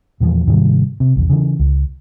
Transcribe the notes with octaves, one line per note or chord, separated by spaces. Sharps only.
E2 A#2 E3 F3
G#2 C3 D#3 G3
C3
A#1 E2
C#3 E3
C#2